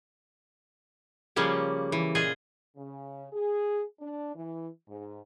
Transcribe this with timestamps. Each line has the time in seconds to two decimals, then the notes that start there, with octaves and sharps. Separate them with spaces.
1.36 C#3 F3 G3 A#3 C#4
1.92 E3
2.15 A#2 F4 G#4 D#5
2.75 C#3
3.32 G#4
4.00 D4
4.35 E3
4.88 G#2